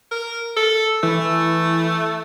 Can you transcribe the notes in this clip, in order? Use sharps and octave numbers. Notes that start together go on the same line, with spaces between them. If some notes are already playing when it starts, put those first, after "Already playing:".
A#4
A4
E3 A3